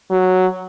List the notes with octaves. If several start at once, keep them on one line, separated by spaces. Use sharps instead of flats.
F#3